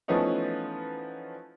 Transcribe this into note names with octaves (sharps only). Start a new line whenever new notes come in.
E3 F3 A3 B3 C#4 D#4